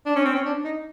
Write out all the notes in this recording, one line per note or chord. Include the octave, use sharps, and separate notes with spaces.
D4
C#4
C4
C#4
D4
D#4